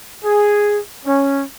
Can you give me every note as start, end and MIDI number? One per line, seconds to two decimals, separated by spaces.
0.24 0.79 68
1.05 1.43 61